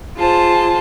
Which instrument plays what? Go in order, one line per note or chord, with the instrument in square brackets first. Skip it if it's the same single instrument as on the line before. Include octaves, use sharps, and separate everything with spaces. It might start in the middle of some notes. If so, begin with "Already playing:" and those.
[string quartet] F4 G#4 C5 A5